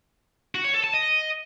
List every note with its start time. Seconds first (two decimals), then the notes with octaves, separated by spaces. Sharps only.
0.55 F#4
0.64 C#5
0.74 A4
0.84 A5
0.94 D#5